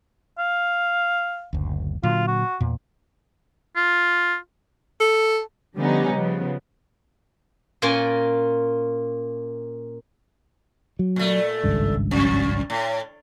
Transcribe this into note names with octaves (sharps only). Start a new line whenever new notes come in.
F5
F#1 D2
A#2 D3 F#3 F4
F#4
E2 A#2
F4
A4
D3 F3 G3 B3 C#4 D#4
C#3 F3 B3
A#2 A#3 C#4 F4 A#4 G#5
F#3
A#2 A3
G#1 C#2 G2
F2
A2